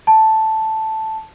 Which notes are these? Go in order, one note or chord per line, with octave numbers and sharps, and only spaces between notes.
A5